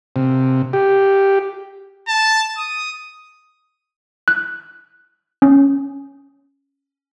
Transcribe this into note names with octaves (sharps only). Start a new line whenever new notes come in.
C3
G4
A5
D#6
F#6
C#4